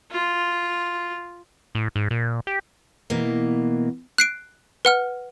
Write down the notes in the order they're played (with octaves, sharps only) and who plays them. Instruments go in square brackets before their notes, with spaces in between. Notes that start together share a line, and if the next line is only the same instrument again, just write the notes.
[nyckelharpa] F4
[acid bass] A2
G#2
A#2
G4
[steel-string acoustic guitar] B2 E3 A#3
[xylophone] F#6 C7 D7
B4 F#5 F6